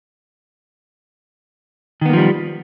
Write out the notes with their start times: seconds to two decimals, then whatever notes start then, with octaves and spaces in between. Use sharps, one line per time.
2.01 D#3
2.05 B3
2.09 A#3
2.13 F3
2.17 G3